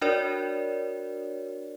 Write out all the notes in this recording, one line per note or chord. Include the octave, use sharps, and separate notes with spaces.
D4 F#4 A#4 C#5 D5